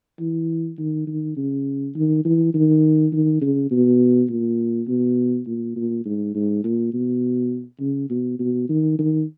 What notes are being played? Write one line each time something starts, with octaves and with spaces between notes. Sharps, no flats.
E3
D#3
D#3
C#3
D#3
E3
D#3
D#3
C#3
B2
A#2
B2
A#2
A#2
G#2
G#2
A#2
B2
C#3
B2
B2
D#3
D#3